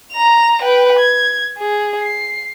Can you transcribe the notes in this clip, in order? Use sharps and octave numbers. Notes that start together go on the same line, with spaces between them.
A#5 F7
B4 G5
G#6
G#4
C7